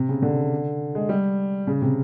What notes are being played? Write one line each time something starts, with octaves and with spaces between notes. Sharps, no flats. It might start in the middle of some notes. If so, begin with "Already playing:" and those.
Already playing: C3
C#3
D3
G#3
G3
C#3
C3